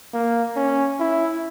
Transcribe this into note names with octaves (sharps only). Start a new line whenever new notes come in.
A#3
C#4
E4